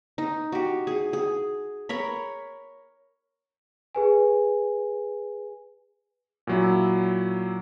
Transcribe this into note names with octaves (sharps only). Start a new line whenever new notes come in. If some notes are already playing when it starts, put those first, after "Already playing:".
D#4
F#4 G4
G#4
G#4
A#4 C#5 B5
G#4 B4 G#5
A#2 F#3 E4